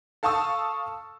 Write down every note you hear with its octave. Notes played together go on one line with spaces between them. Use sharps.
A4 F5 A5 C#6 D#6 E6